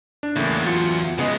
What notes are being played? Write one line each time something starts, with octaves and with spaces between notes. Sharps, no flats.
D4
E2 A2 C#3 A#3
F#3 F4 C#7
C#3 G#3 B3 G#4 D#5